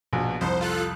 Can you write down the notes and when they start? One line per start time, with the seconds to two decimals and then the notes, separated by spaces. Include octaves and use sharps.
0.13 A#1 B2
0.41 C2 F2 C5
0.61 F4 A4 F#6